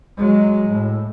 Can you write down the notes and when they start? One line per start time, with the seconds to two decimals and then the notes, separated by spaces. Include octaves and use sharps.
0.17 F#3 G#3
0.68 A2